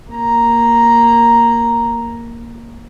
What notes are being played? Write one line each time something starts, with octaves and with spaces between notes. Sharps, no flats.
A#3 A#5